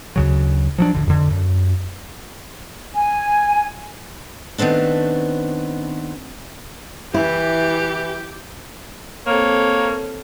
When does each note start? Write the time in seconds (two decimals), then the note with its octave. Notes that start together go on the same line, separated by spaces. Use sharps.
0.16 D2 C#3 F#3
0.78 F3 F#3 D4
0.94 D1 F2 D3
1.07 F2 D3
1.31 F#2
2.95 G#5
4.58 D#3 A3 B3 C4 D4
7.14 E3 E4 G4
9.27 A#3 C4 A4 C#5